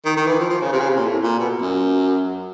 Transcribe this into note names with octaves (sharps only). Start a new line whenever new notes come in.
D#3
D#3
E3
F3
F3
C#3
C3
C#3
C3
A#2
A2
A#2
B2
F#2